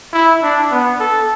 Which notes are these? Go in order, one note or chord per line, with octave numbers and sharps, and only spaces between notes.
E4
D4
B3
A4